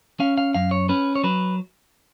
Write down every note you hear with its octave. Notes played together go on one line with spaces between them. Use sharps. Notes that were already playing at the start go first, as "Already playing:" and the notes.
C#4 F5
F5
F#2 F5
C#5
C#4 B4
C#5
F#3 B4